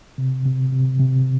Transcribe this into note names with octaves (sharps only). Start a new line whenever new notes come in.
C3
C3
C3
C3